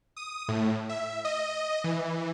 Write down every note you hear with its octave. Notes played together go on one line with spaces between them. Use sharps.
D#6
A2
E5
D#5
E3